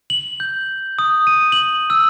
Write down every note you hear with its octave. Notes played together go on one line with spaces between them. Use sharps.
F#7
G6
D#6
D#7
F#7
E6